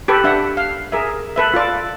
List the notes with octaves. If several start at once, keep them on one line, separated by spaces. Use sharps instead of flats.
G4 A4 B4
D4 E5 F#5
F5
G#4 A#4 E5
A4 B4 E5
F4 A4 D5